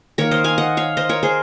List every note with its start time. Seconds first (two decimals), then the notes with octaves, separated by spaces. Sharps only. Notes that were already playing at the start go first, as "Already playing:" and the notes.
0.18 D#3 A#3 A#4 C#5
0.31 C5 D#5
0.44 F5 G#5
0.58 D#5 F#5
0.77 C#5 F5
0.97 C5 D#5
1.09 A#4 C#5
1.23 G#4 C5